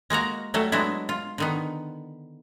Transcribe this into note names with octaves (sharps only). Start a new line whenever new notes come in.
G#3 A#3 F#4 A#5
F#3 G3 A3 A4
F#3 G#3 B3 D4 E4
F4
D3 D#3 B3